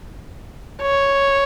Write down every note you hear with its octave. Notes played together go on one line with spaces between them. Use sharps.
C#5